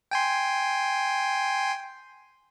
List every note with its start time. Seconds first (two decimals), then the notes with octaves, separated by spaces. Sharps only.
0.11 G5 G#5 C6